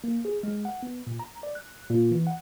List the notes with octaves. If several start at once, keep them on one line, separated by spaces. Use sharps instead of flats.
A#3
G#4
G#3
F#5
B3
A#2
A#5
D5
F#6
A#2
E3
F#5